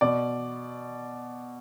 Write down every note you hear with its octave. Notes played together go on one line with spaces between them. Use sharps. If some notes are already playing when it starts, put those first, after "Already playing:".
B2 D5